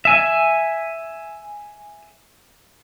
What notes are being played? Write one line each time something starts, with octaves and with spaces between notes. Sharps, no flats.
E5 G#5